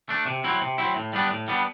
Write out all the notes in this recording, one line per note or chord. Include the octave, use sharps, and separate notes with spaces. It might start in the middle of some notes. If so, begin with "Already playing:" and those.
A3 D4
C3
F#3 C4 E4
C3
F#3 C4 E4
A2
G3 B3 D4
A2
G3 B3 D4